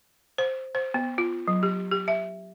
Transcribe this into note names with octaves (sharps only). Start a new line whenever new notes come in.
C5
C5
B3
F4
F#3
G4
G4
E5